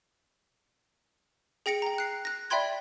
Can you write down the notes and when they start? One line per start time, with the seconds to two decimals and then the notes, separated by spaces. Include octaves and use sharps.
1.66 G#4 G5 A#6 C#7 D7
1.82 G5 A#5
1.98 F#6 C7
2.25 F#6 A#6
2.50 D5 E5 G5 B5 C6 G#6